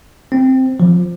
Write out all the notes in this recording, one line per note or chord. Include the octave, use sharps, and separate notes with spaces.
C4
F3